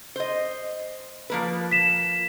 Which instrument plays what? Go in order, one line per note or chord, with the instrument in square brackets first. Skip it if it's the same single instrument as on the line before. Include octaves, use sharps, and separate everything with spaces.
[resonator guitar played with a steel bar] C5 D#5
F3 A#3 B4
[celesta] B6 E7